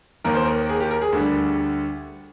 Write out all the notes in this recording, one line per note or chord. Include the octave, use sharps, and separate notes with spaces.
D#2 D#3 A#3 A#4
C5
A#4
G#4
G4
A#4
G#4
D2 D3 G3